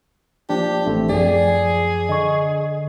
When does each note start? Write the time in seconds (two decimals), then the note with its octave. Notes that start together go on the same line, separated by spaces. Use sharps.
0.49 F3 A#3 D4 G4
0.86 A1 A3 C4
1.09 F#2 F3 G#4 D5
2.09 D3 D#5 C#6